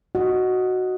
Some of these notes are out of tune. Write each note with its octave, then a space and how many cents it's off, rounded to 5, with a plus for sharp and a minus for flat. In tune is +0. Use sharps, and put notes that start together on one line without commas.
F#4 +0 D#5 +0